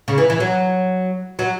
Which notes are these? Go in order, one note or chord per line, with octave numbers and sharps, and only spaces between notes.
C#3
E3
E3
F#3
F#3